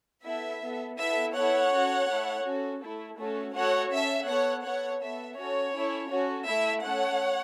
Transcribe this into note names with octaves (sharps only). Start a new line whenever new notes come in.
B3 E4 A4 E5
B3 A4
B3 E4 A4 E5
B3 E4 A4 C#5 F#5
C#4 F#4 A4
A3 E4 A4
C#4 F#4 A4
A3 E4 A4
A3 C#4 F#4 A4
A3 F#4 A4 C#5 F#5
C#4 A4 E5
B3 A4 C#5 F#5
B3 A4 C#5 F#5
B3 A4 E5
C#4 F#4 A4 C#5
C#4 E4 A4
C#4 F#4 A4
A3 E4 A4 E5
A3 C#4 A4 C#5 F#5